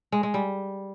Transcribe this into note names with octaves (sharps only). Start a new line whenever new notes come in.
G#3
G#3
G3